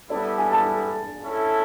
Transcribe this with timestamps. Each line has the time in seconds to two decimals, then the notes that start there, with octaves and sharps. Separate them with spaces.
0.10 G3 B3 E4 A4 D5
0.38 G#5
0.52 A5
1.21 C#4 E4 A4